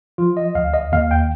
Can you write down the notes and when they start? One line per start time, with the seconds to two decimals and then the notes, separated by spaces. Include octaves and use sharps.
0.18 F3 F4
0.37 D#5
0.55 D2 F5
0.74 D#5
0.92 D#2 F5
1.11 G5